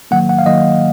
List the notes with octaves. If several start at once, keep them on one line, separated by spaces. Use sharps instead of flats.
D#3 F#3 A#3 F#5
F#5
F5
D#3 F#3 A#3 D#5